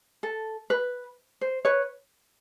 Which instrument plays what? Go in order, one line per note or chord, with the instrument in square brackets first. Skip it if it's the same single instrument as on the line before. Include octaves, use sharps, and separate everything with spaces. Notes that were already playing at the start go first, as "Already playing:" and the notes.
[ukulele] A4
B4
C5
B4 C#5